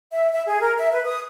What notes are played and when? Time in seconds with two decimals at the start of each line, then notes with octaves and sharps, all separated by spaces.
0.13 E5
0.33 E5
0.47 G#4
0.61 A#4
0.78 E5
0.92 B4
1.07 D#6